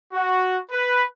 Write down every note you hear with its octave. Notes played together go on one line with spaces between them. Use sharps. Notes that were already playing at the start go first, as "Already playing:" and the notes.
F#4
B4